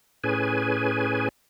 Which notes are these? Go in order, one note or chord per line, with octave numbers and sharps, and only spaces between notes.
A2 C#4 G#4 B4 G#5